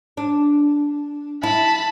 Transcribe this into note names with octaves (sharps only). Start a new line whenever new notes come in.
D4
E4 A5 B5